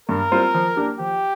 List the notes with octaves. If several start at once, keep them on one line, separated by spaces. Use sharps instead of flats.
G2 A#4
G3 C4 F4 C5
F3
A#3 D4 G4
F3 G4